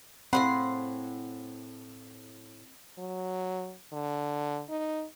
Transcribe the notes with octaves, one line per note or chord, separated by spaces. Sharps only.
A2 G#3 C4 G#4 F5 F#5 B5 C6
F#3
D3
D#4